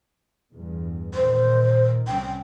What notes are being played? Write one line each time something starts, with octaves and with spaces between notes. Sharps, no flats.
E2 G2
A#2 D#3 C5
C2 C#4 G5